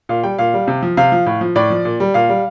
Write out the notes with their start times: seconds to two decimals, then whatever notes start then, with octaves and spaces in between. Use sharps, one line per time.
0.09 A#2 F5
0.23 G3 G5
0.38 A#2 F5
0.54 G3
0.68 C3
0.83 F3
0.97 C3 F5
1.12 F3
1.26 A2
1.41 F3
1.55 A2 D5
1.70 F3
1.85 A#2
2.00 G3
2.14 A#2 F5
2.29 G3